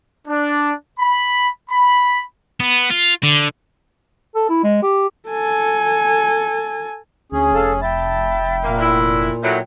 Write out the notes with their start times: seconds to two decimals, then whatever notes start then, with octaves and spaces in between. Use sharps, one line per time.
0.28 D4
0.99 B5
1.70 B5
2.60 B3
2.90 F4
3.23 D3
4.35 A4
4.49 E4
4.64 G#3
4.83 G4
5.29 A4 G#5
7.32 D2 C#4 G#4
7.52 F1 A4 F5 A5
7.81 E5 G5 A5 B5
8.64 A#2 A#3
8.79 A2 D4 E4
9.43 A2 F#3 E5 G5 G6